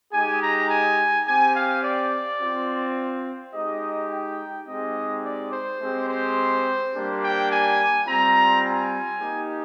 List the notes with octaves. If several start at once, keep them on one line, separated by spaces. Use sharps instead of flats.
G#3 D#4 G4 G#5
A#5
G#5
C4 G4 G#5
F5
D5
C4 F4
G#3 D#4 G4 D#5
G5
G#3 C4 D#4 G4 D#5
D5
C5
G#3 C4 G4
C5
G3 A#3 D4 G4
G5
G#5
G3 C4 F4 A#5
G#5
A#3 D#4 G4